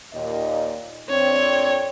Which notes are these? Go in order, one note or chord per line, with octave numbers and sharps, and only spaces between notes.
D#2 A#2 D#5
F2 C4 D4 C#5